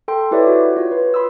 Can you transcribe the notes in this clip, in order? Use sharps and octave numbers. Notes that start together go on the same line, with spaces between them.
A4 G5 C6
E4 G4 B4 C#5 D5 E5
F#4
F4 C#5
B4
B5 C6 D#6 E6